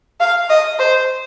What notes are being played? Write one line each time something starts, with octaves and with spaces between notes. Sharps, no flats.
F5
D#5
C5